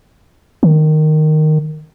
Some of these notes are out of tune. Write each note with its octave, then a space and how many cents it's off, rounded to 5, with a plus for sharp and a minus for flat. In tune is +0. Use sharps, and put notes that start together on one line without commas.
D#3 -10